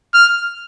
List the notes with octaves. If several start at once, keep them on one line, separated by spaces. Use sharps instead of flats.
F6